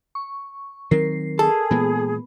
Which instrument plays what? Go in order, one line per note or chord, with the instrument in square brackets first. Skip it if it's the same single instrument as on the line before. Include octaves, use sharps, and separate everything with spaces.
[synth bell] C#6
[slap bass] D#3 F#3 C4 [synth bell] A#4 C7
[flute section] G#4 [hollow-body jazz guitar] A4
[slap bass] A#2 E3 G#3 [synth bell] B3